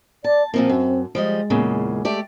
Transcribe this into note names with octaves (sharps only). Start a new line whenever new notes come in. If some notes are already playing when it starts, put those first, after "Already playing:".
D5 A5
A#2 F3 A#3 C4
F#2
F3 G3 G#3 D#5
E2 A#2 C#3
A3 G4 D5